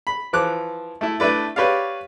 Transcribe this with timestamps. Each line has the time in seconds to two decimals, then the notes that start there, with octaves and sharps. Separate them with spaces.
0.07 B5
0.33 E3 F3 D6 F#6
1.01 A3 E4
1.20 A3 D4 E4 B4 D5
1.56 G4 B4 C#5 D5 F5